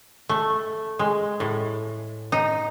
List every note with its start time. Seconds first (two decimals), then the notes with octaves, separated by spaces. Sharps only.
0.29 A3
0.99 G#3
1.40 A2
2.32 D#4